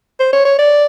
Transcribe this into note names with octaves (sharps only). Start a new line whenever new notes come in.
C5
C#5
C#5
D5